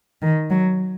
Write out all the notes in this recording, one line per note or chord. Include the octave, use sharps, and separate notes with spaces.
D#3
F#3